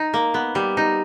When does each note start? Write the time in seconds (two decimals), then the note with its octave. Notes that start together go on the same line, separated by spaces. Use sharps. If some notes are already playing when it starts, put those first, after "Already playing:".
Already playing: D#4
0.14 A#3
0.34 B3
0.55 G3
0.77 D#4